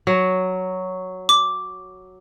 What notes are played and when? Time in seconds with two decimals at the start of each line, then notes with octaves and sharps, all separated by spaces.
0.07 F#3
1.29 D6